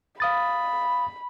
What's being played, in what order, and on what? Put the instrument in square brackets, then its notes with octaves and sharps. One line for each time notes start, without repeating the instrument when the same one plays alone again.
[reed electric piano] F5 D#6 A6 [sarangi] B5